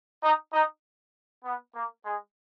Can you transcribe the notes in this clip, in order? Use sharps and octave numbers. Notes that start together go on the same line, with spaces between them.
D#4
D#4
B3
A#3
G#3